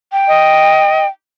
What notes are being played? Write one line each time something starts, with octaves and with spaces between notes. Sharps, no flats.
G5
D#5